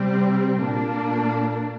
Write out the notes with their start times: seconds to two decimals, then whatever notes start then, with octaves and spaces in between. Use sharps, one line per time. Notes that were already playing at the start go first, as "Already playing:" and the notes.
Already playing: C3 G3 C4
0.63 A#2 A#3 D4